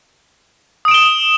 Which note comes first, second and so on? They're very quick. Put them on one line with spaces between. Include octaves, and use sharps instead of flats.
D#6 D7 E7 G7